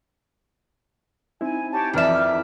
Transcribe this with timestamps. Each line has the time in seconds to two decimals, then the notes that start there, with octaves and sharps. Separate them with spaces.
1.41 C4 D#4 E4 G#5
1.71 G4 C#5 A5
1.93 F2 D#3 E3 D5 E5 F6